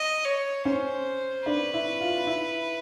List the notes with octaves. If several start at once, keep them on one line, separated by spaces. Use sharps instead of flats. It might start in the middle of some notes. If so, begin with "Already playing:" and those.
Already playing: D#5
C#5
C#4 C5
D4 B4
E4
F4
E4